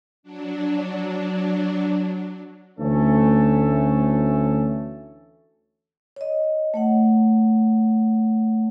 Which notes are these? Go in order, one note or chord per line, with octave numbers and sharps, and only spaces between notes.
F#3 D4
D2 E3 A3 C#4 A4
C#5 D#5
A3 C#5 F#5